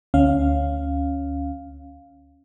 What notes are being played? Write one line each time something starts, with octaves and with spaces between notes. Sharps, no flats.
D2 C#4 F5